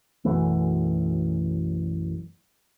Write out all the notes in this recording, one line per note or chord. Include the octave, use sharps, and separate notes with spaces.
B1 F#2 E3 A3